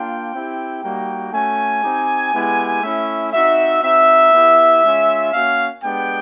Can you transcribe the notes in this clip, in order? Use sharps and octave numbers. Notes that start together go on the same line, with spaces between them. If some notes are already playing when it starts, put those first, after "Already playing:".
Already playing: A#3 D4 F4 G5
C4 E4 G4
G3 A#3 D#4 F#4 G5
A3 C#4 F#4 G#5
C4 D#4 G4
G#3 B3 E4 G4
A3 C#4 E4 E5
C4 D#4 F#4 E5
C4 D#4 F#4 E5
B3 E4 G4
G#3 C#4 F4
A#3 C#4 F#4 F5
G#3 B3 D4 G4 G5